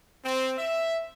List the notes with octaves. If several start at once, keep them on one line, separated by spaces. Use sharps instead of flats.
C4
E5